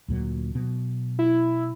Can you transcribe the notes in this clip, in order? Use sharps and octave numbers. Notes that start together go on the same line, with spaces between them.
D2 A#2 F#3
B2 F#3
E4